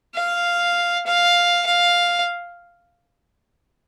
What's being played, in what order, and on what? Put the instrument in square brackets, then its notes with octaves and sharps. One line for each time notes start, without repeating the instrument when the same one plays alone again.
[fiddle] F5
F5
F5